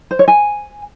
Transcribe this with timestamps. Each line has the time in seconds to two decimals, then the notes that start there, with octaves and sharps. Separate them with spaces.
0.11 C5
0.19 C#5
0.28 G#5